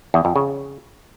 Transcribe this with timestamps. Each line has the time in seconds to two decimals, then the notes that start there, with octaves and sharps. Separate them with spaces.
0.14 E2
0.25 F2
0.36 C#3